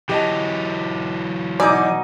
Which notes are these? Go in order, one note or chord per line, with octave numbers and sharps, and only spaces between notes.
E3 F#3 G4 D#5 A5
B2 D#4 D5 D#5 G#5 D6